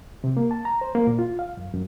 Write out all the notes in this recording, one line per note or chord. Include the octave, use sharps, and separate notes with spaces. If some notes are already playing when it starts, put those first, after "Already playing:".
C3
A#3
A5
A#5
C5
A#3
A#2
F4
F5
F#2
F#2